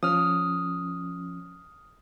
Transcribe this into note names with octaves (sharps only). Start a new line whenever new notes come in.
F3 C#4 D#6 F6